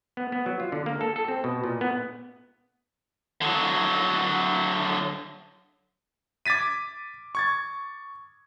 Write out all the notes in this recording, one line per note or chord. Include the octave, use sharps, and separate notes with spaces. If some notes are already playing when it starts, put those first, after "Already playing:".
B3
B3
F#3
F4
D3
A#3
A4
A4
C4
B2
A#2
B3
D3 F#3
D6 G#6 A6 B6 D#7
C#6 G#6 A6